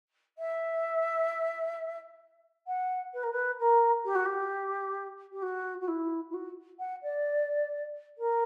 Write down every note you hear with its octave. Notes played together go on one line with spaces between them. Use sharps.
E5
F#5
B4
A#4
B4
A#4
G4
F#4
G4
G4
F#4
F#4
E4
E4
F#4
F#5
D5
A#4